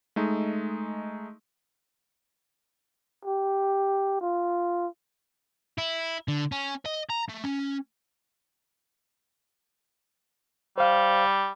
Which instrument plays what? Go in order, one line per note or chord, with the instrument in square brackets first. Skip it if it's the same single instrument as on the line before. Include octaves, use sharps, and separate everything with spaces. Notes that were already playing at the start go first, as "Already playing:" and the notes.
[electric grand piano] G#3 A3 D#4
[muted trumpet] G4
F4
[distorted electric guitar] E4
D3
C#4
D#5
A#5
A3
C#4
[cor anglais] G3 [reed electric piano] C5 F5